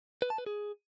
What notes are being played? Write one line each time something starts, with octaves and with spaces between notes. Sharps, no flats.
B4
A5
B4
G#4